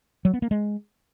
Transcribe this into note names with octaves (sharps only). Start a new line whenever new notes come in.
F#3
B3
A#3
G#3